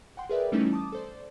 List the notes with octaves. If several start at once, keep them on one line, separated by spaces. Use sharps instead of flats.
F#5 G5 C6
G#4 A#4 B4 D5 E5 G5
E3 G3 A3 C#4 D#4 E4
A5 D6 D#6
A4 C5 D5